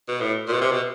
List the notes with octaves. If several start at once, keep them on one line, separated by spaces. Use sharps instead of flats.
B2
A2
A#2
B2
C3
B2